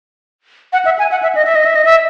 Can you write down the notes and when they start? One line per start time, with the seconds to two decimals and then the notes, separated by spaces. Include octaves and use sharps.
0.73 F#5
0.85 E5
0.99 G#5
1.11 F#5
1.23 E5
1.35 D#5
1.45 E5
1.55 D#5
1.65 E5
1.75 D#5
1.85 E5